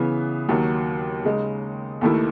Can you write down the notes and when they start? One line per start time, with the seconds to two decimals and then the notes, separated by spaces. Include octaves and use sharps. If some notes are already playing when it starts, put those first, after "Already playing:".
Already playing: C#3 E3 B3
0.49 D#2 D#3 F#3
1.25 C#3 G#3 D#4
2.01 D#2 D#3 A3 E4